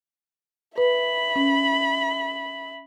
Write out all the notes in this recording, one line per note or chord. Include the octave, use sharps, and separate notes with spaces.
B4 E5 B5
C#4